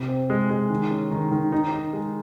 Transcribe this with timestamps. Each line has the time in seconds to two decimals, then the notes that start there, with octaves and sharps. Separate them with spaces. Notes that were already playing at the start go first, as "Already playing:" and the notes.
Already playing: C3
0.08 C4
0.30 G#3
0.50 G#3
0.70 D#3
0.91 C#4
1.11 D#3
1.31 D#3
1.52 D#4
1.72 D#4
1.93 G#3